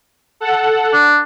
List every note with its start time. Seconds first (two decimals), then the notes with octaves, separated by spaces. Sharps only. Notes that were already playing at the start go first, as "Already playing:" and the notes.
0.40 A4 F#5
0.93 D4